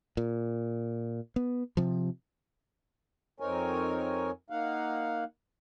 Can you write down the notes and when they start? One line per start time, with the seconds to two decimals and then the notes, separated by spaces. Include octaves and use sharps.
0.17 A#2
1.36 B3
1.77 C3 F3
3.40 F2 C4 D#4 A#4 C#5 G#5
4.50 A#3 D#4 F5 F#5